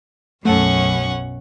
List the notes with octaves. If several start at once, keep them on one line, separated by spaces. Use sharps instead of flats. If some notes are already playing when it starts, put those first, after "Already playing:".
B1 F#2 A3 C#4 A4 F#5 C#6